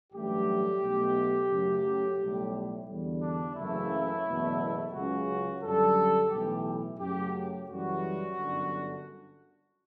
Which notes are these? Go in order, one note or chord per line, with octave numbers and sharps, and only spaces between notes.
A1 G2 F#3 A3 G4
B1 B2 A3
F#2 C#3 F#3 A3
B1 A2 G3
E2 D3 G3
D4
F#1 F#2 C#3 E3 A3 E4
F#1 E2 B2 A3
C#2 C#3 F#3 F#4
F#2 D3 G3 A4
B1 A2 E3 G4
F#2 C#3 F#3 A3 G4
F#2 C#3 E3 G3 F#4
G1 F#2 D3